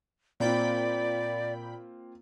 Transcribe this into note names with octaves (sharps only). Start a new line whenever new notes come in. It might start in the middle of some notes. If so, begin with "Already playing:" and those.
A#2 A#3 C4 F4 D5 G5 B5